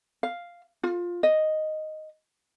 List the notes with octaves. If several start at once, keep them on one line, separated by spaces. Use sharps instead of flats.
F5
F4
D#5